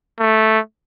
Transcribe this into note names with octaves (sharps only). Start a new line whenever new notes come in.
A3